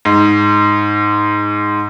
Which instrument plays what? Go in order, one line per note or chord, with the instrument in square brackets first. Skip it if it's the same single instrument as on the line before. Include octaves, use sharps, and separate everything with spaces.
[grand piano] G#2